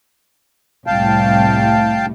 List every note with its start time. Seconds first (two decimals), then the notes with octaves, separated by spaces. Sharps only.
0.87 C2 A2 F5 G5 A5